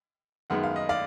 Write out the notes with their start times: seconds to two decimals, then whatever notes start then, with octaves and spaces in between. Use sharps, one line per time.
0.50 F#2 D#3 G#3 B3 F#5
0.63 F5
0.76 D#5
0.89 D5 F5